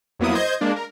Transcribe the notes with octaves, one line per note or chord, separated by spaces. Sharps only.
F2 F#3 A#3 B3 E4 D#6
C5 D#5 G6 G#6
G#3 A#3 D4
A#4